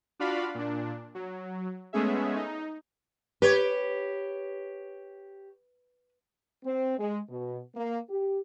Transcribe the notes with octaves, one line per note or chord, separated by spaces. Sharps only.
D4 F4 F#4 D5 F5 B5
A#2 D4
F#3
G#3 A3 B3 C#4 G#4 E5
D#4
G4 B4 C#5
C4
G#3
B2
A#3
G4